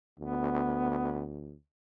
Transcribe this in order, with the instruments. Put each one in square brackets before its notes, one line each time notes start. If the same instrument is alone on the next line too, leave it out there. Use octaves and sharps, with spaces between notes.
[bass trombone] D2 [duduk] B3